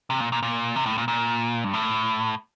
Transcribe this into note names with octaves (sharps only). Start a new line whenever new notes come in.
C3
A#2
A#2
A#2
C3
A2
A#2
A#2
G2
A2